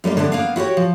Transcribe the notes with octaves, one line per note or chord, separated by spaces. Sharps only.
F#2 G3 A#3 D#5
D3 A3 B3 D4
A#3 B3 F5
E4 F#4 G4 C#5
F3